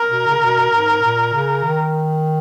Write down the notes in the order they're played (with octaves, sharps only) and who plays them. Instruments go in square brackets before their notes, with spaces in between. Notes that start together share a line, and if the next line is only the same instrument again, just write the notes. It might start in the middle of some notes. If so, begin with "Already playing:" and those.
Already playing: [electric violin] A#4
[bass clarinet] B2
C#3
B2
G#2
A#2
C#3
D#3